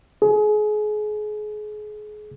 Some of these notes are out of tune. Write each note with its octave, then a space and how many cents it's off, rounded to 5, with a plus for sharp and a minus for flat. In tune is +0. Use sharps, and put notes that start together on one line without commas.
G#4 +30